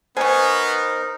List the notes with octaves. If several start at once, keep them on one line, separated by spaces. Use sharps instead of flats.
B3 D#4 A#4 C5 G#5 C#6